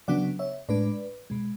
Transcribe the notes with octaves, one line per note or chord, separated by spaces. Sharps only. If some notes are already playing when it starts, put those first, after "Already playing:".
C#3 F#3 B3 D4 D5 F#5
C#5 E5
A2 G#3 D4 B4 D5
B2 G#3